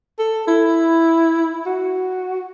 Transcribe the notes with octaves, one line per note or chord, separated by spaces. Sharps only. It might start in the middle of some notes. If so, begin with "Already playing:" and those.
A4
E4
F#4